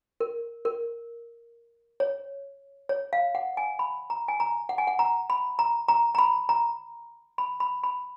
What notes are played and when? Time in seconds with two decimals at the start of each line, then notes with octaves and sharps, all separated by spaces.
0.20 A#4
0.65 A#4
2.00 C#5
2.89 C#5
3.13 F5
3.35 F#5
3.57 G#5
3.79 B5
4.10 A#5
4.28 G#5
4.40 A#5
4.69 F#5
4.78 G#5
4.87 F#5
4.99 A#5
5.30 B5
5.59 A#5
5.88 A#5
6.15 A#5
6.18 B5
6.49 A#5
7.38 B5
7.60 B5
7.84 B5